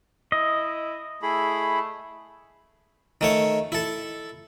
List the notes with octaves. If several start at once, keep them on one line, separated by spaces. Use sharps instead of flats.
E4 D#5
A3 E4 G#4 B5
D#3 A3 C#5
E4 A4